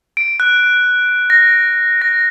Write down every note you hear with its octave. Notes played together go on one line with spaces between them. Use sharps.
D7
F#6
A#6
A#6